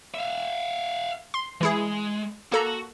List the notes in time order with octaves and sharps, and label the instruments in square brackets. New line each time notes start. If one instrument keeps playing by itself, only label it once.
[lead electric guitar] E5 F5
[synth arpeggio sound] C6
[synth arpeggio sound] E3 E4 G#4 [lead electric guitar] G#3
[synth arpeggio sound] A#3 A4 A#5 [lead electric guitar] F#4